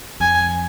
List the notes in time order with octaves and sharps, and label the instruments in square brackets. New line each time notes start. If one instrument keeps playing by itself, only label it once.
[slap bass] F2 [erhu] G#5